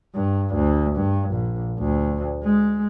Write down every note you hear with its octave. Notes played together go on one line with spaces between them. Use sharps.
G2
D2
G2
A#1
D2
G#3